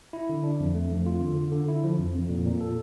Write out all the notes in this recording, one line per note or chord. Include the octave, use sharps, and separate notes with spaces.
E4
D3
D4
F2
A3
F2
F4
D3
D3
D3
E4
F3
F2
F2
A#2
A#2
A4